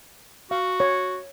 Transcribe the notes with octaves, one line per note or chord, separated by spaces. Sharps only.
F#4 F5
C#5